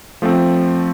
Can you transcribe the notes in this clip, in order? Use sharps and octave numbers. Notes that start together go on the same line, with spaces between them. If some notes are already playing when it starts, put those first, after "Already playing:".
F3 A3 C4